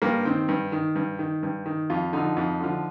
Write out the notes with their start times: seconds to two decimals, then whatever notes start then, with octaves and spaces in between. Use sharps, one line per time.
0.02 G2 A#3
0.25 D#3 C4
0.49 G2
0.72 D#3
0.96 G2
1.19 D#3
1.43 G2
1.66 D#3
1.90 F2 F4
2.13 D3 F3 D#4
2.37 F2
2.60 D3 F3